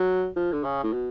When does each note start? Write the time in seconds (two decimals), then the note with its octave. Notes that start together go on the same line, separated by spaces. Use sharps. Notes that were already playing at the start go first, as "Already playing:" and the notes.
Already playing: F#3
0.36 F3
0.53 D3
0.64 C#3
0.84 A2
0.93 B2